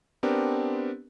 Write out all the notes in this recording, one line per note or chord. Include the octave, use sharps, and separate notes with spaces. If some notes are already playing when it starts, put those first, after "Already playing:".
B3 C4 D4 G4 A#4